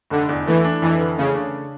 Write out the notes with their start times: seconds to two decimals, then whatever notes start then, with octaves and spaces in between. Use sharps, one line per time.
0.10 F1 D3
0.29 E2
0.47 E3 A3
0.65 D4
0.82 F2 E3
0.99 D3
1.17 C#3 A3
1.35 D4